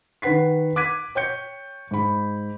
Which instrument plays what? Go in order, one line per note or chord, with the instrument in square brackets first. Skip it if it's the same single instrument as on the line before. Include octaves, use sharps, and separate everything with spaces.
[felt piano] D#3 B4 F#5 B6 C7
D6 F#6 G#6 B6 D#7
C#5 G5 G6 C#7
G#2 B5